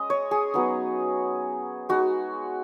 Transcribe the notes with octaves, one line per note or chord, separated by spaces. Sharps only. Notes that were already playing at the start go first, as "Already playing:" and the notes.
Already playing: G#3 C#4 D#5
C#5
G#4
F#3 B3 D#4
G#3 D#4 F#4